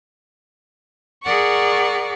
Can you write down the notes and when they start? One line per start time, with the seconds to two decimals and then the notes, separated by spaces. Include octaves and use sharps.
1.23 G#4 A#4 D5 F#5 C#6